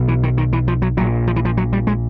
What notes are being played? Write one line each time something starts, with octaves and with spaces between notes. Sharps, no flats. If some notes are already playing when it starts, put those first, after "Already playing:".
Already playing: B1 B2
E3
D#3
D#3
E3
F3
F#3
A#1 A#2 F#3
F3
E3
F3
F#3
G3
G#3